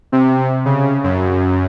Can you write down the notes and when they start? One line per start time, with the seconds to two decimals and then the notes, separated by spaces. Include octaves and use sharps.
0.12 C3
0.65 C#3
1.04 F#2